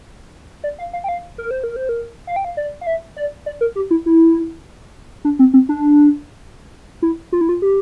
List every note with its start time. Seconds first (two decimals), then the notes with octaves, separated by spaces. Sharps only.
0.64 D5
0.79 F5
0.93 F5
1.04 G5
1.09 F5
1.38 A#4
1.51 C5
1.64 A#4
1.76 C5
1.89 A#4
2.27 F5
2.36 G5
2.45 F5
2.57 D5
2.81 F5
2.87 E5
3.17 D5
3.46 D5
3.61 A#4
3.76 G4
3.91 E4
4.06 E4
5.25 D4
5.39 C4
5.54 C4
5.69 D4
7.02 E4
7.32 F4
7.41 E4
7.49 F4
7.62 G4